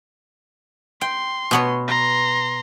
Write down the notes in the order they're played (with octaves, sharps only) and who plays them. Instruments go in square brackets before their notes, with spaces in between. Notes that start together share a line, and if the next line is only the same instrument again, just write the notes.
[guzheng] G5 [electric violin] C6
[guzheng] B2 B3 C#5
[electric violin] A#5 C6